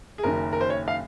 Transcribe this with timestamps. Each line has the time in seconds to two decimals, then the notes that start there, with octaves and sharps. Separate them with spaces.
0.18 G#4
0.23 F#1 F#2 D#3 A#4
0.53 A#4
0.61 C5
0.70 C#5
0.88 F5